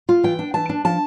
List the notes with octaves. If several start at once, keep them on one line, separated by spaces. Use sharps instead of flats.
F4
E3 G5
D4
E3 A5
D4
F3 A5